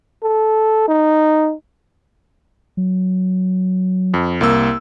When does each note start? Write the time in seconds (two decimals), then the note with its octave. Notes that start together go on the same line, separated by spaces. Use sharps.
0.23 A4
0.88 D#4
2.77 F#3
4.14 F2
4.41 C2 A#3 E6